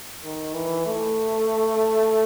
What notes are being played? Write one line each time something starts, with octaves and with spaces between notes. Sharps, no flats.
D#3
E3
A3